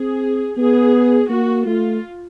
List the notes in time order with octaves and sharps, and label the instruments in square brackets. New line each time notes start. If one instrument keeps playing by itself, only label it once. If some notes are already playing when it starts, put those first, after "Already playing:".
Already playing: [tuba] C4 [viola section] G#4
[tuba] B3 [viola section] G#4
[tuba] A#3 [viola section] F#4
[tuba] A3 [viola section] F4